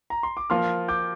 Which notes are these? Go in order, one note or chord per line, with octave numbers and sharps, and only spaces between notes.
A#5
C6
D6
F3 A#3 F4 C6 F6
D6 G6